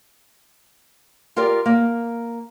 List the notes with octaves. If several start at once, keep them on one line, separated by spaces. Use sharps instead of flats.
F4 G4 A#4 D5
A#3